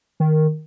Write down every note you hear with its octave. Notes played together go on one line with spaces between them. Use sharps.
D#3